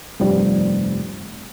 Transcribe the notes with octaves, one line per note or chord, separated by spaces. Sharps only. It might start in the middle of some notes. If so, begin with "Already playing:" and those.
F1 G2 F3 G3